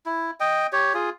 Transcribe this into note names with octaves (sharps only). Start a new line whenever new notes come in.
E4
D#5 G5
G4 C#5
F4 G#4